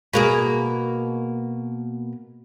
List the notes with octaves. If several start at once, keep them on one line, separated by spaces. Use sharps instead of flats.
B2 A#3 G#4